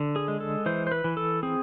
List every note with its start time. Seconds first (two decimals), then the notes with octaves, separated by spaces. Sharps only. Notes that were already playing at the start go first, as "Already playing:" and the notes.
Already playing: D3
0.16 G#4
0.28 G#3
0.40 A4
0.66 E3 C5
0.87 C5
0.92 B4
1.04 E3
1.17 A4
1.43 C4 G#4